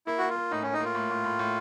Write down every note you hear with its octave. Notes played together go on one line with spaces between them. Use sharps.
A#3 E4
A#3 F#4
F4
A#3
A2 D#4
A2 C#4
D#4
A#3 F4
A2
A2
A2
A2